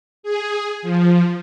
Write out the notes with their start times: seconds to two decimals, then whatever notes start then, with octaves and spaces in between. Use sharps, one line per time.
0.23 G#4
0.82 F3